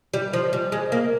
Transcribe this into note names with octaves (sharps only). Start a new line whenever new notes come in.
G3
F3
G3
G#3
A#3